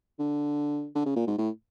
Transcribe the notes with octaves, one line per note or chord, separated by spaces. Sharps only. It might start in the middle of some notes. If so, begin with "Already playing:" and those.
D3
D3
C#3
A#2
G#2
A2